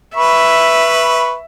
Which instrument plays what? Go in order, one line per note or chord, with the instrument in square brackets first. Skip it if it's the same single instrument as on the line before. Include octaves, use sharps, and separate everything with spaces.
[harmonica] B4 B5 C#6 [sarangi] E5